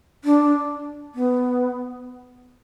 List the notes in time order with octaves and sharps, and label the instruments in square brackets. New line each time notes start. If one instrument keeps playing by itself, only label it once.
[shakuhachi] D4
B3